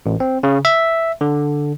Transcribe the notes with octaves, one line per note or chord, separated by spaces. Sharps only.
A1
C4
C#3
E5
D3